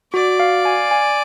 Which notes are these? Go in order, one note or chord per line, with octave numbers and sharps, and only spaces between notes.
F#4 D5
F5
G#5
G#5